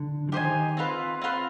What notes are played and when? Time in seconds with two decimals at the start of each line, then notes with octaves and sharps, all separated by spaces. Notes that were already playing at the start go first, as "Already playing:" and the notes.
Already playing: D3
0.29 F3
0.32 D#3 G4 C5 D#5 G#5
0.77 C4 F4 B4
1.22 C4 F4 B4